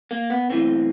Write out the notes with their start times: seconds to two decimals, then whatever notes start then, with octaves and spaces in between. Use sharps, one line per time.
0.11 A#3
0.30 B3
0.50 B1 A2 E3 C4